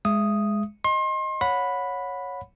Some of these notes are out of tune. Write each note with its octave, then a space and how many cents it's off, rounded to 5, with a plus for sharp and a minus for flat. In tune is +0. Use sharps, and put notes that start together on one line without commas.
G#3 +0 E5 +30 D#6 +0
D#5 +0 C6 +35
C#5 +0 F#5 -25 B5 +0